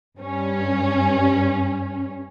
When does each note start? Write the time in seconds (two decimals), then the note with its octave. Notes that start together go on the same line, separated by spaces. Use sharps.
0.17 G2 C#4